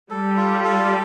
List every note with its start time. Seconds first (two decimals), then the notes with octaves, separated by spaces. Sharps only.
0.11 G3 A4
0.37 F4
0.64 A4